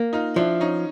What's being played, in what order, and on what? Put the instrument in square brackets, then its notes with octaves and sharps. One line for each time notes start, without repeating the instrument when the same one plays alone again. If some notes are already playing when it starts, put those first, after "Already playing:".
Already playing: [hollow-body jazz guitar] A#3
[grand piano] D#4 F4
[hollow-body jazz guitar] F3 [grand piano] D4 E4
[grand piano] C#4 D#4